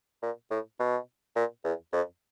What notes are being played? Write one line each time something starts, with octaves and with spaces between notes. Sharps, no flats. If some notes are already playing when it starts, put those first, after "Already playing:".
A#2
A2
B2
A#2
E2
F2